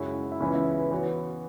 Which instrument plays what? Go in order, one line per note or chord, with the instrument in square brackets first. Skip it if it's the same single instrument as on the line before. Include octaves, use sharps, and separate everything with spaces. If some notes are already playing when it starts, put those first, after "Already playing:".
Already playing: [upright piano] F#2 C#3 G#3 E4 C#5 [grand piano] F#4
[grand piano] E4
[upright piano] C#2 C#3 E3 B3 [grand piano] C#4
[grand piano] E4
B4
[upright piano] E3 B3 F#4 C#5